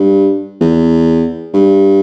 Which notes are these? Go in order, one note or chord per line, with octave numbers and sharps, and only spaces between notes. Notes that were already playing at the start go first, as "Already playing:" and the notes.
Already playing: G2
E2
G2